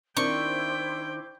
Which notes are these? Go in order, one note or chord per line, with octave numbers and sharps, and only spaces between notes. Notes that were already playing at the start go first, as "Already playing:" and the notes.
D#3 C4 D4 E4 C5 G5 C#6 D6